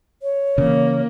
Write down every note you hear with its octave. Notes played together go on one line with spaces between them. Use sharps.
C#5
C#3 E3 A#3